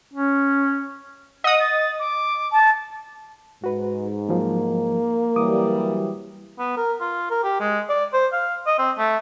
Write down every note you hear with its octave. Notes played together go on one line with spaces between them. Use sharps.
C#4
D#5 F#5 D#6
A6
D6
A5
G#2 F#4 B4
F3 F#3 A#3
E3 F#3 G3 D6 D#6
B3
A#4
F4
A#4
G4
G#3
D5
C5
F5
D#5
C4
A3